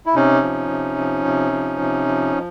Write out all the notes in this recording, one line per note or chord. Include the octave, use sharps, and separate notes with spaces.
E4
C3 C#4 D#4
F3
C3
F3
C3
F3
C3
F3